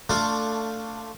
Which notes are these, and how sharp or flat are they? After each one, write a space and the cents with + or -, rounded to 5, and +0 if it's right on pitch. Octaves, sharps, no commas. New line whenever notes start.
A3 +20 D4 +0 F4 +0